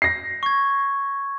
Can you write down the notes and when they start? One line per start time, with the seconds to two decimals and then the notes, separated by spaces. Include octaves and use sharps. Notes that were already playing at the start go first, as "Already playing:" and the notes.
0.02 A#6 C7
0.43 C#6 G#6